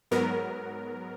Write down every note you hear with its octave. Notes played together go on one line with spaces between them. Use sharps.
G#2 F#3 B3 A#4